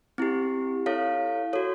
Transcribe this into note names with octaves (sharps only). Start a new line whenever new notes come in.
C4 E4 G4
E4 A4 C#5 F5
F#4 A4 C#5